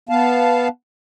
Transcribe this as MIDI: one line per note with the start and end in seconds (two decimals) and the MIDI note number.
0.09 0.68 59
0.09 0.68 77
0.09 0.68 81